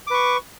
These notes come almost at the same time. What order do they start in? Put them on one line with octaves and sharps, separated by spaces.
D6 B4 C#6